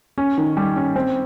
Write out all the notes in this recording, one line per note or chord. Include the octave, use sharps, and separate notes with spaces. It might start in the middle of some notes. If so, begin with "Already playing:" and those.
C#4
D#3
G3
C#4
C4